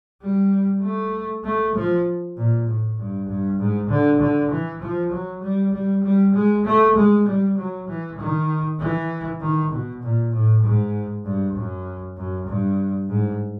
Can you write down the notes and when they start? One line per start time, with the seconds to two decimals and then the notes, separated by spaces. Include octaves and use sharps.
0.22 G3
0.83 A3
1.44 A3
1.75 F3
2.37 A#2
2.68 A2
2.98 G2
3.28 G2
3.59 G#2
3.89 D3
4.20 D3
4.51 E3
4.82 F3
5.11 F#3
5.43 G3
5.73 G3
6.03 G3
6.34 G#3
6.65 A3
6.96 G#3
7.26 G3
7.57 F#3
7.88 E3
8.19 D#3
8.80 E3
9.41 D#3
9.71 B2
10.03 A#2
10.33 A2
10.63 G#2
11.25 G2
11.55 F#2
12.17 F#2
12.47 G2
13.09 G#2